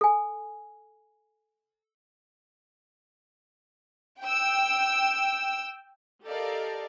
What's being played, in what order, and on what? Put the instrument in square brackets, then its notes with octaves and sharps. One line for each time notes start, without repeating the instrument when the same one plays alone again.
[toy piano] A4 G#5
[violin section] G5 E6
[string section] G4 A4 A#4 D5 D#5 F5